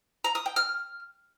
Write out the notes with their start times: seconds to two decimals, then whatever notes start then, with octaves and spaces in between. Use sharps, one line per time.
0.24 A#5
0.35 D#6
0.46 G5
0.56 F6